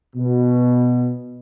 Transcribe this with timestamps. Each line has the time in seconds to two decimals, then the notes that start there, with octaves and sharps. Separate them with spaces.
0.16 B2